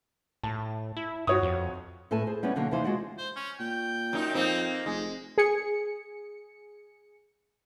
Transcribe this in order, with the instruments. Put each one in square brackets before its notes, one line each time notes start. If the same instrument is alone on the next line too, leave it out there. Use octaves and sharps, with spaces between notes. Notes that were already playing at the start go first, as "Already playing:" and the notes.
[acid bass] A2 [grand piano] A5
[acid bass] E4
[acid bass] G2 [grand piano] F#4 C#5 D#6
[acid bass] F2
[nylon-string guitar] A2 A4 B4 G#5 A5
G#4 C5
G3 B3 C#4 E4 B4 C#5
B2 D3 F#3 A#3
D#2 C3 E3 D#4 C5 F5
G#3 F4 F#4 D5 F#5
[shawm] C5
C#4
[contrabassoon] A#2 [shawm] G5
[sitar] F#2 D#4
[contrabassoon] F2 [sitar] A#3 C4 D#4
[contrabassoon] F1 [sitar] G#3
[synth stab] G#4 C#7